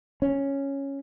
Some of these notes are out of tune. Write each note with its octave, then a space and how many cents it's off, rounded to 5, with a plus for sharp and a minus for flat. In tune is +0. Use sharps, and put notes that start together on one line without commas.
C#4 -5